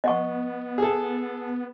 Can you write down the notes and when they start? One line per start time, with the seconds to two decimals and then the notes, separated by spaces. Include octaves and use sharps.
0.04 B3 D#5 F#5 C#6
0.78 G#4 A4